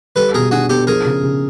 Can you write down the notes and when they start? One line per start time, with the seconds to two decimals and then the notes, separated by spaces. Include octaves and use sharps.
0.16 G3 A4 B4
0.34 B2 G#4 A#4
0.51 D4 F#4 G#4
0.69 B3 G4 A4
0.87 F3 G#4 A#4
1.05 C#3
1.23 C#3